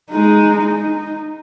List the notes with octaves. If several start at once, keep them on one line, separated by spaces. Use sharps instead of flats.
G#3 D#4
D#4